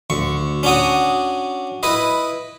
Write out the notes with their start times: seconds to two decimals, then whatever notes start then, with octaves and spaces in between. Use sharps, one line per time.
0.10 D2 C#6
0.63 C#4 D4 F#4 D#6
1.83 E4 B4 D#5